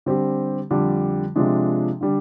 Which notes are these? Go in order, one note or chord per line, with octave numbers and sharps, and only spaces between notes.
D3 G3 C4 G4
F2 D3 G3 D4
C3 F3 G#3 D4
D3 G3 D4